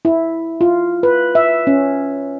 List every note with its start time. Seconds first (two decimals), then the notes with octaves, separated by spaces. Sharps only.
0.05 E4
0.61 F4
1.03 B4
1.35 E5
1.67 C#4